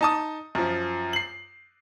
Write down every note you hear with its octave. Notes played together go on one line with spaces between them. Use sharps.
D#4 A5 D#6
F#2 F3
C7 F#7